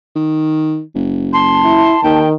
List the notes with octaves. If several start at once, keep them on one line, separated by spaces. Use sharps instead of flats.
D#3
F#1
A5 C6
E4
D#2 D#3 G5